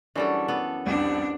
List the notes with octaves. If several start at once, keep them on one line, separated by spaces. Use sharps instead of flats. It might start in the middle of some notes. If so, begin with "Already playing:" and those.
F#2 E3 G3 D4 A4 A5
B3 A4
C2 F2 D4